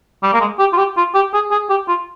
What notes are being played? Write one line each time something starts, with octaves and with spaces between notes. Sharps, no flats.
G3
A#3
G#3
G4
F4
G4
F4
G4
G#4
G#4
G4
F4